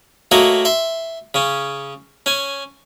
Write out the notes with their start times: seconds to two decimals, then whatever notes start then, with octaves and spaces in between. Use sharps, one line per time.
0.31 A3 A#3 F#4 A4 C#5 D#5
0.65 E5 C6
1.34 C#3 C#4
2.26 C#4 G#5